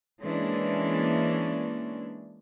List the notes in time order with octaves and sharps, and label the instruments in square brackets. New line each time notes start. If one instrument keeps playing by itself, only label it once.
[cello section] E3 G#3 A#3 C#4 D4